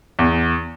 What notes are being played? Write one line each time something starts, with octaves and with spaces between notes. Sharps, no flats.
E2